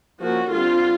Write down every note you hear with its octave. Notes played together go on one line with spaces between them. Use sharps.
F3 A#3 C#4 F#4
D3 G3 C4 F4